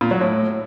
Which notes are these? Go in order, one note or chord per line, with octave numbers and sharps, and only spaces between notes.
A#2
F#3
A2